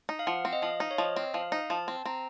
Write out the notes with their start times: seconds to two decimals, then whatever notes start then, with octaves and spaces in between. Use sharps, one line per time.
0.09 D#4
0.19 F5
0.27 F3 F#5
0.45 C4
0.53 D#5
0.62 F3 F5
0.80 D#4
0.91 C#5
0.98 F3 D#5
1.16 C4
1.34 F3 F5
1.52 D#4
1.70 F3 A5
1.88 C4
2.06 C4 A#5